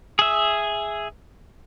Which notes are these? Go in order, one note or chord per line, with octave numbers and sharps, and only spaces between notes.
G#4 E5